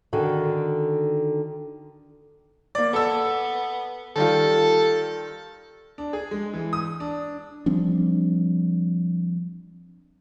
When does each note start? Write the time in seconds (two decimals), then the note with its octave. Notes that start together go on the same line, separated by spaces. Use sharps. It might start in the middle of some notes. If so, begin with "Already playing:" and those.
0.13 D3 D#3 F#4 G#4 A4
2.75 A#3 D5
2.93 B3 A4 E6
4.16 D#3 G3 F4 A4
5.98 D4
6.13 G#4
6.31 G#3
6.53 E3
6.73 D#6
7.00 D4
7.66 F3 G3 C4 D4